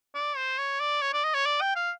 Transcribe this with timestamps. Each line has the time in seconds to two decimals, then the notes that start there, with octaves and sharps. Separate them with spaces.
0.15 D5
0.36 C5
0.58 C#5
0.80 D5
1.01 C#5
1.13 D5
1.24 D#5
1.34 C#5
1.45 D5
1.61 G5
1.75 F5